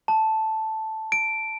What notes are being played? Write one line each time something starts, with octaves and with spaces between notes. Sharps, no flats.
A5
D7